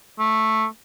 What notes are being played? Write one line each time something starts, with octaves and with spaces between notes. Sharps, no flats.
A3